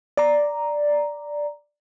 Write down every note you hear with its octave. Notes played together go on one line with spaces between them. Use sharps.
D5 A#5